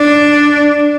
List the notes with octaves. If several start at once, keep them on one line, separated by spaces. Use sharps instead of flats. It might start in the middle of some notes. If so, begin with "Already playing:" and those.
Already playing: D4